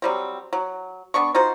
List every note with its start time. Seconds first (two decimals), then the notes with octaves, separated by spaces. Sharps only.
0.02 F#3 G3 C4
0.53 F#3
1.14 B3 D4 C#6
1.34 D#4 F4 F#4 C5